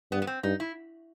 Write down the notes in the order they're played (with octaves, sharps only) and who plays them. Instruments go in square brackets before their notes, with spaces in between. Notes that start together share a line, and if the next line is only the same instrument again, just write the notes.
[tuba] G2 [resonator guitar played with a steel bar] B3
[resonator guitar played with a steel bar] B3
C4
[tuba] G2 [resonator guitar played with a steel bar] D#4
[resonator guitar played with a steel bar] E4